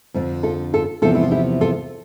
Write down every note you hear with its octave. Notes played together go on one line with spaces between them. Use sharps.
F2 D3 F3
F4 A4
F4 A4
E2 C3 F3 F4 A4
E4
F4
E4 G4
F4 A4